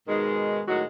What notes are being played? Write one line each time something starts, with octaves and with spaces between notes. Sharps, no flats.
G#2 B2 D#3 G#3
A2 D#3 F#3 G#3 F#4